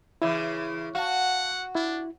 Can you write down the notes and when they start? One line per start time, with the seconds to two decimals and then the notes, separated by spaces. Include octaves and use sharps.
0.22 C#3 E3 E4 E5 D6
0.95 F#4 F5 F#5 A5
1.75 D4 E4